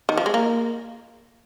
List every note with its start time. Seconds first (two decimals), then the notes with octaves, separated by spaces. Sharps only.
0.09 D#3
0.17 F3
0.26 G#3
0.34 A#3